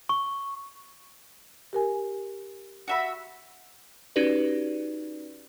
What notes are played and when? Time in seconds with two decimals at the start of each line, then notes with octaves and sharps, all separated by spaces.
0.09 C#6
1.73 G4 A#4 G#5
2.88 F#4 E5 B5
4.16 C#4 D#4 F#4 G4 B4 D5